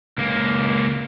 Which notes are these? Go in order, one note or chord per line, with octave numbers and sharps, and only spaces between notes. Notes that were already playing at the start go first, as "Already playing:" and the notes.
C#2 A#3